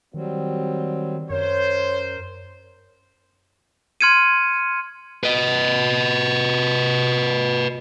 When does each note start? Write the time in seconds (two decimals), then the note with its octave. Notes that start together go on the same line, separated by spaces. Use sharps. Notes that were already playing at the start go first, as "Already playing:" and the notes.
0.14 D#3 F#3 G3 C4
1.30 F#2 A#4 C5 C#5
4.01 C6 F6 G#6 C#7 D#7
5.24 B4 D#5